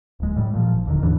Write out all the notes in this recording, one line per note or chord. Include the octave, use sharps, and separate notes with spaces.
D1 G#3
A2 G3
A#2 F3
G#1
D#1 D3 D#3
D#2 G#2 E3 D4